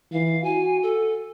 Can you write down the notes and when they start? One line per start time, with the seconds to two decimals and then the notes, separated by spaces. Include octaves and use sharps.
0.12 E3 F5
0.44 F#4 G#5
0.83 A4